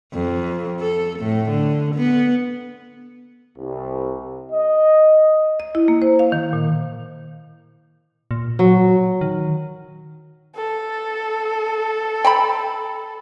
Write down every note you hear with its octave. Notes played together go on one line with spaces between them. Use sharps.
F2
A4
A2
D3
B3
C2
D#5
D#5
E4
A#3
C5
F5
D#3
A#2
A#2
F#3
D#3
A4
G5 A#5 B5